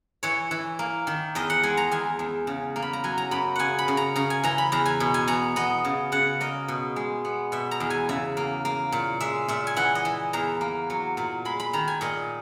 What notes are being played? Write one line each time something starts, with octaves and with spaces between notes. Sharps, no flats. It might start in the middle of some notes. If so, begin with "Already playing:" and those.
E3 C#5
E3
A#3
D#3
E2 D#5
F#5
G#3 G#5
A#5
E2 G#5
E2
C#3
A#3
B5
A#5
F#3 G#5
A#5
F#2 B5
C#3 F#5 G#5
B5
C#3
A#5
C#3 A#5
G#5
E3 A#5
B5
E2 A#5
G#5
B2
G#5
B3 A#5
B3 D#5
C#3
C#3 F#5
A#3 D#5
B2
G#3
B3
B2 E5
A#5
E2
G#5
C#3 E5
A#3
A#3
A#2
G#3 E5
A#2 E5
G#5
E3 F#5
D#5
E3
E2 A#5
A#3
F#3
A#2
G#3 B5
B5
D#3 A#5
G#5
A#2 D#5